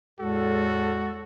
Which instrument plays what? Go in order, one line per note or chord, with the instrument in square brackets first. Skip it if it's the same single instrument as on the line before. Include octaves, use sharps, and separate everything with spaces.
[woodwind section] E2 A2 A4 [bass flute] G#3 [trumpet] F#4